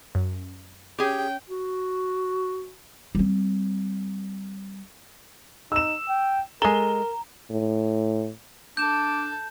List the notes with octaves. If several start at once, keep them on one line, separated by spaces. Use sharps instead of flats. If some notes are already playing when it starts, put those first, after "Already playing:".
F#2
C#4 G4 G#4 G5
F#4
G3 C4
D#4 E6 E7
G5
G#3 A4 A#4 A#5 G7
A2
D4 A4 D6 G6 E7